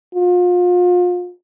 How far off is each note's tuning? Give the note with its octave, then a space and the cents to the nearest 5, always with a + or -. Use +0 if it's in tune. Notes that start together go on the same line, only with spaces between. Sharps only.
F4 +35